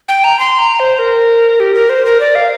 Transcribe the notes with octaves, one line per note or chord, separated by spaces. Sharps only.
G5
A#5
C6
A#5
C5
A#4
G4
A#4
C5
A#4
D5
F5